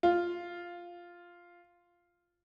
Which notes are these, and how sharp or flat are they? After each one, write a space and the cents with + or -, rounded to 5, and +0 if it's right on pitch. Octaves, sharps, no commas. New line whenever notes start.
F4 +0